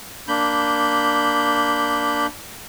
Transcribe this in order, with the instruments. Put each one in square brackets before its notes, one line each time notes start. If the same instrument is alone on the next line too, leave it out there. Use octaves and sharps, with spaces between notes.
[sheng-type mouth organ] A#3 D4 B5 G6